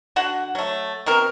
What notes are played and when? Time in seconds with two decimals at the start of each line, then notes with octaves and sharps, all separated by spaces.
0.16 D3 F#4 F#5
0.55 F#3 A3
1.06 B2 C4 A#4